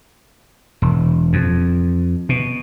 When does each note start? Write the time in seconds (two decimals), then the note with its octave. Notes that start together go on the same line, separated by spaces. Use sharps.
0.82 E1
1.33 F2
2.29 B2